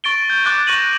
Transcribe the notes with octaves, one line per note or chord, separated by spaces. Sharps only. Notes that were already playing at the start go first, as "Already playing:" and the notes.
C#6 A6 D7 G7
G6
D6 F#6 A6 G7
C#6 F#6 A#6 D#7 F#7